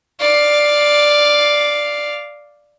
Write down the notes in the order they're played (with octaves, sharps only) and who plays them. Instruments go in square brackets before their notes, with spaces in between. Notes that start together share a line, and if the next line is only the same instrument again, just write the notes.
[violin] D5 F5